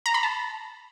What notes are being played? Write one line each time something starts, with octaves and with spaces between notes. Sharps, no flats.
A#5
B5
A5